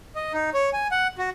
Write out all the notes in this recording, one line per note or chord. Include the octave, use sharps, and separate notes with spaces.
D#5
D#4
C#5
G#5
F#5
F#4